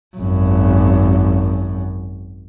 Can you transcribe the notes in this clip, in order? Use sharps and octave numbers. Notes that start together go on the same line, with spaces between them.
G#1 F#2